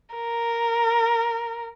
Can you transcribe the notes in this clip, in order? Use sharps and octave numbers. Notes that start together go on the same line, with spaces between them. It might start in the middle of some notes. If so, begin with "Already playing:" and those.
A#4